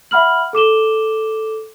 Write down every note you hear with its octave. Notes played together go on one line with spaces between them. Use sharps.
E5 F#5 B5 F6 F#7
A4 D6 E7 G7